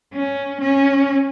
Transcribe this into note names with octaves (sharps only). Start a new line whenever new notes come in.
C#4
C#4